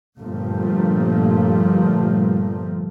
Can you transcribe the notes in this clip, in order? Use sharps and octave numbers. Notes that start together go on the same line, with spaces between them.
G1 G2 A#2 F3 A3 A#3